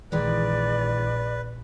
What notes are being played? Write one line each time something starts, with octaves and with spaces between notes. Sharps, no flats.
A#1 D#3 E3 G#3 B4 D5